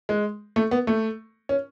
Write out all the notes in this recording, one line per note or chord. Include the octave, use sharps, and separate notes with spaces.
G#3
A3
B3
A3
C#4